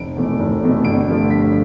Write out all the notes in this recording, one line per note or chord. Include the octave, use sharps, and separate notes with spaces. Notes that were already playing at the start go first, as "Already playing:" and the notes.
Already playing: F1 D7
E2 B2 A3
F1
E2 B2 A3
G1 D7
G2 F3 A3
G1 B6